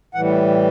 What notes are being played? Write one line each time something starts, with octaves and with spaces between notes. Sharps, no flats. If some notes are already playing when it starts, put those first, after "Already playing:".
A2 E3 G3 F#5